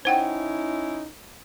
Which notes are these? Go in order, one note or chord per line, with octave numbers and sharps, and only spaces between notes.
C#4 D#4 E4 C5 F#5 G5